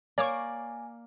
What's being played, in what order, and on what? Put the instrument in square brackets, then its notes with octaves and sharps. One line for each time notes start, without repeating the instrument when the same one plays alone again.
[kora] A#3 A#4 D5 [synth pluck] C#5 C#6 [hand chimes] G#5